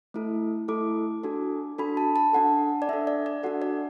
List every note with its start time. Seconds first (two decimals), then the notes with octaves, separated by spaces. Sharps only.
0.14 A3 E4 A4
0.68 A3 E4 A4 D6
1.23 D4 F#4 A4
1.78 D4 F#4 A4 B5
1.97 A5
2.16 A5
2.33 D4 A4 F#5
2.82 D5
2.89 D4 A4 E5
3.07 D5
3.26 D5
3.43 D4 F#4 A4 F#5
3.62 D5